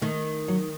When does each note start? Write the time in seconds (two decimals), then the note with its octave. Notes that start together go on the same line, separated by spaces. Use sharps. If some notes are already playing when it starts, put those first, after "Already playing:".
0.01 D#3 A3
0.48 F#3